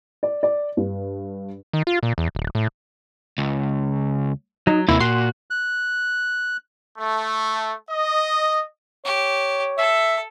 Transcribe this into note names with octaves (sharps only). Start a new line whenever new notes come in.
D5
D5
G2
D#3
F4
A#2
E2
D1
A2
C#2
F#3 D#4
D#2 C3 A#3 E4
A#2 F#4 C6
F#6
A3
D#5
G4 C#5
A4 E5